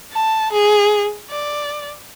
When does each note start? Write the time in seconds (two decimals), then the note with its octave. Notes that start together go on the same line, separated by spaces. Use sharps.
0.12 A5
0.52 G#4
1.31 D5